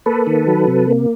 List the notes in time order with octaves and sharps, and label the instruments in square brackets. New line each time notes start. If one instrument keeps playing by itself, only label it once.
[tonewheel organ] A#3 A4 B4
D#3
F#3
C3
A#3